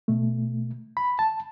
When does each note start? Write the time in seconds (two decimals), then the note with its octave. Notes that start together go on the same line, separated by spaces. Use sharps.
0.08 B2 A3
0.97 B5
1.19 A5